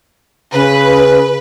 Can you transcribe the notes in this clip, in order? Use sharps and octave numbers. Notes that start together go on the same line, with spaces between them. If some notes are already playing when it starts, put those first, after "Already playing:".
C#3 B4